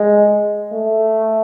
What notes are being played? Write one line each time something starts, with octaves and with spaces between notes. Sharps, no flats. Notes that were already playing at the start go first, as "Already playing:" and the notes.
Already playing: G#3
A3